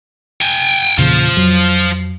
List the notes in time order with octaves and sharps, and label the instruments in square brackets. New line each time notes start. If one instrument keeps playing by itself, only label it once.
[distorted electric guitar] G5 G#5
[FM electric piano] E2 A#2 C#3 [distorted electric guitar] F4 C5
[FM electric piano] F2 F#3